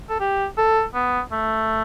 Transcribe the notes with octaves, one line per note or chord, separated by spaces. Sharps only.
A4
G4
A4
B3
A3